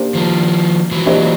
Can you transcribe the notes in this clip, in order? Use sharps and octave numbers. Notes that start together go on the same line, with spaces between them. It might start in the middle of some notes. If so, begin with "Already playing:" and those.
Already playing: A#3 D4 G4 C5
D#3 F3
E3 F#3
A#3 D4 G4 C5 D#5